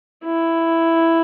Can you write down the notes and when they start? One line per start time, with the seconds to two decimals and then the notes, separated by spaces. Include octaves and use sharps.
0.25 E4